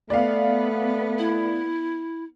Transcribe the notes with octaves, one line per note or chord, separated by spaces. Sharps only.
A3 B3 D5 F5
E4